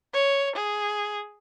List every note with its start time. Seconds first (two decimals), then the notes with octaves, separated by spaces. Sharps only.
0.14 C#5
0.56 G#4